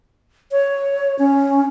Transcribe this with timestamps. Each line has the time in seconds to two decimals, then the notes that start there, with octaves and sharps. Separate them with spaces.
0.52 C#5
1.19 C#4